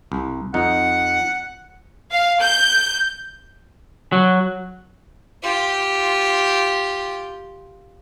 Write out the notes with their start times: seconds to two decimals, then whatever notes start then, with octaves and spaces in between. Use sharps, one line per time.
0.12 C2
0.54 F2 D#4 F#5
2.11 F5
2.41 G6
4.12 F#3
5.43 F4 G4